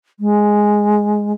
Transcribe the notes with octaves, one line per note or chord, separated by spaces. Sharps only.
G#3